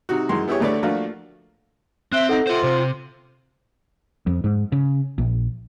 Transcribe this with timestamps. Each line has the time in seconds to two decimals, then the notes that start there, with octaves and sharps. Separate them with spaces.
0.09 C3 D#4 F#4
0.29 F#2 E3 G#3 C6
0.48 B3 E4 G4 G#4 C#5
0.61 A1 D3 A3 B4 C#5 D5
0.83 F3 A3 A#3 D4 F4 F#4
2.12 C4 E5 F#6 G7
2.29 D#4 A4 F#5
2.47 F4 C5 E5
2.63 C3 C5
4.27 F2
4.44 G#2
4.72 C#3
5.18 A#1